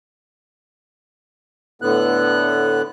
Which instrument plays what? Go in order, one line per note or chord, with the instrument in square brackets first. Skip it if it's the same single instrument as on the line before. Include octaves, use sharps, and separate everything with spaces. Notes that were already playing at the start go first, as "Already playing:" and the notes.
[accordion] A2 D3 B3 F#6